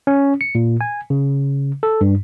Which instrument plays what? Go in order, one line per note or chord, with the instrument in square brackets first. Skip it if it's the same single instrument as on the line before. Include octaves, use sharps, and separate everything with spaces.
[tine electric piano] C#4
C#7
A#2
G#5
C#3
A4
G2